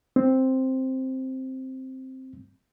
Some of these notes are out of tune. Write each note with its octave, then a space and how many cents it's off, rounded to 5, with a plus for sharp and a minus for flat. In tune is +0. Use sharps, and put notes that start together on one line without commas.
C4 +5